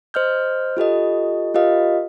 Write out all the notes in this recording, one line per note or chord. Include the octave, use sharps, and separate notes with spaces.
C5 D#5 F6 G6
F4 G4 A4 D#5
F4 G4 A#4 D#5 F5